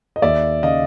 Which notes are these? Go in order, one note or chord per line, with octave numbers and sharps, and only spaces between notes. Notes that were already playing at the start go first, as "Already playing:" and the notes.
D#5
D#2 D5 E5
C#3 D#5 F5